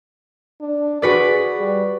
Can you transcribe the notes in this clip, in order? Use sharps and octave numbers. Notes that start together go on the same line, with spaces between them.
D4
F#4 G#4 B4 D5
G3